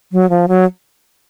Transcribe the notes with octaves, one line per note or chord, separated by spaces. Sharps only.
F#3
F3
F#3